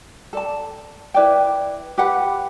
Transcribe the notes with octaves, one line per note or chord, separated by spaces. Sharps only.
A4 D5 A5
E4 B4 D5 G5
G4 B4 F#5 B5